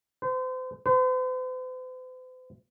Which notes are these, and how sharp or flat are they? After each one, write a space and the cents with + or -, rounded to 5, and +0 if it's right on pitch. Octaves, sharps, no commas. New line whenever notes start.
C5 -35
C5 -45